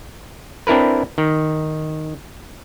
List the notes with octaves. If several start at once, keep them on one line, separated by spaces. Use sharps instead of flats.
C4 D4 E4 A#4 B4
D#3